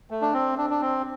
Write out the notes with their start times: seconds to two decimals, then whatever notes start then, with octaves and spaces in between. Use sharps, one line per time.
0.10 A3
0.22 D4
0.33 C4
0.58 D4
0.70 D4
0.81 C4